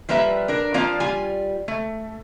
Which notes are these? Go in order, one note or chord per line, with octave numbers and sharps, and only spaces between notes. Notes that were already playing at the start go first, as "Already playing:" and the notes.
F3 G3 A#3 B4 E5
D4 A#4
F3 A#3 C4 F4 D5 F5
G3 F4 G#5
A3